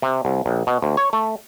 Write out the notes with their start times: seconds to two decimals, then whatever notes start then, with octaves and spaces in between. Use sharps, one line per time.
0.02 C3
0.25 C2
0.46 A#1
0.67 B2
0.82 D2
0.97 C#5
1.13 A3